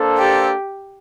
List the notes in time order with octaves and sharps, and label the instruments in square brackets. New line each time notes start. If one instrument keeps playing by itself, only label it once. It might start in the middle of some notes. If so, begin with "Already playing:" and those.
Already playing: [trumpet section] A#3 D4 A4 C5
[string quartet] G4